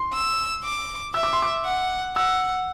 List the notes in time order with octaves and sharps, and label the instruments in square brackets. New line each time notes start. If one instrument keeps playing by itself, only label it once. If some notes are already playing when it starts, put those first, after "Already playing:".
Already playing: [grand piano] C6
[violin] E6
D6
[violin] E5 [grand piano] E6
[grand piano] D6
C6
D6
[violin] F#5
[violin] F#5 [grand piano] E6